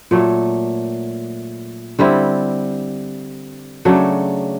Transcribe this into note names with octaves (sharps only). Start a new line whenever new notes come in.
A#2 F#3 A3
D3 G3 C4 E4
C#3 F#3 A3 D4